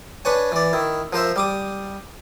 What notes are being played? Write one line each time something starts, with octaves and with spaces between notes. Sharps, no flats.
D4 B4 C#5 G#5
E3 D5
D#3 E4
F3 A#4 C5 E5
G3 D6 D#6